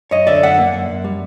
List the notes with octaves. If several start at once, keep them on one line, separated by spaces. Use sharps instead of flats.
F#2 C#5 D#5
D3 D5 E5
F#2 E5 F#5
A#3
F#2
F#2
G3